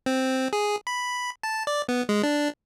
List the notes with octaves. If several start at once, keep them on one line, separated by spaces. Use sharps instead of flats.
C4
G#4
B5
A5
D5
B3
G#3
D4